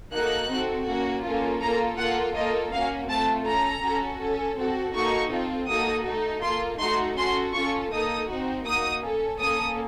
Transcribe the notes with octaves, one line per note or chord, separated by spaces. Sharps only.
A#3 D#4 F#4 A4 F#6
C4 F#4 A4
A#3 C#4 F#4
A#3 C#4 F4 A4
A#3 F4 A4 A#5
A#3 F4 A4 F#5
A#3 F4 A4 D#5
A#3 C#4 F#4 F5
A3 C4 F4 A4 A5
C#4 A4 A#5
C#4 F#4 A4
C#4 A4
C4 F#4 A4
A#3 D#4 F#4 A4 C#6
C4 F4 A4
A#3 D#4 F#4 A4 D#6
A3 D#4 A4
A#3 F4 A4 C6
A3 D#4 F#4 A4 C6
C#4 F#4 A4 C6
C#4 F4 A4 C#6
A#3 D#4 A4 D#6
C4 D#4 F#4
A#3 D#4 F#4 D#6
C#4 A4
A#3 C#4 A4 D#6